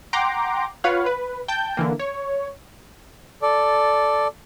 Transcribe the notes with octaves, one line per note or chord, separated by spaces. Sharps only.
F#5 G5 A#5 C6 D6
F4 B4 C#5 F5 F#5
B4
G5 A5 G6
D3 E3 A#3
C#5
A4 D5